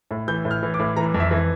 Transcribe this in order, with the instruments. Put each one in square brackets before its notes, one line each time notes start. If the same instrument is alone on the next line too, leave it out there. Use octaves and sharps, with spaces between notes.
[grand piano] A2
E3 G6
A2
F6
E3
D6
A2
E3 A#5
F2
E5
E3